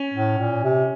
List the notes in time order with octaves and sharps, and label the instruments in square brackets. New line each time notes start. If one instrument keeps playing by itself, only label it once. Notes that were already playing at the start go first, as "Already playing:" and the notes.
Already playing: [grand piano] C#4
[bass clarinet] A2
A#2
C3